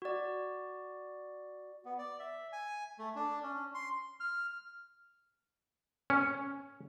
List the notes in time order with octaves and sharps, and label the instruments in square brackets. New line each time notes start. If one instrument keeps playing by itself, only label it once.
[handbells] F#4 D5
[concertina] B3
D5
E5
G#5
A3
D4
C#4
C6
F6
[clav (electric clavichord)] C#4